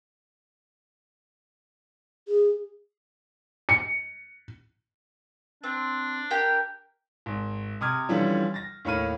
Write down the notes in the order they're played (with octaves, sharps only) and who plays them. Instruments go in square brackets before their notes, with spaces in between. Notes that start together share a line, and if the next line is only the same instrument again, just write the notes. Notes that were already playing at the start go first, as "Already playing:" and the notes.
[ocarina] G#4
[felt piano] C#7
[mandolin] C4 [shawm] D4
[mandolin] G4 A#4 G5
[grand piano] G#1
C3 D6 D#6 F6 G#6
D3 E3 F3 G3 C#4
A6 A#6
D#2 A2 C#5 B5 F6 D#7